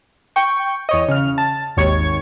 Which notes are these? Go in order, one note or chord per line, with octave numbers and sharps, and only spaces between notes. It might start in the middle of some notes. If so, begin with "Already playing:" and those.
G5 C#6
E2 C#5 D#5
C#3 F6
A5
G#1 D#2 C#5 C#6 G#6 C#7